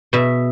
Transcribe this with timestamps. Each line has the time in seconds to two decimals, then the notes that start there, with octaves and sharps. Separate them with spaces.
0.13 B2 E5